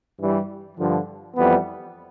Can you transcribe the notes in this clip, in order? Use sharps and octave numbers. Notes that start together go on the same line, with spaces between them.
G2 E3 G3
G2 D3 F3
F2 E3 G3 B3